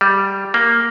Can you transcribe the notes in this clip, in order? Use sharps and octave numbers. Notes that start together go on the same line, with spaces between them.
G3
A#3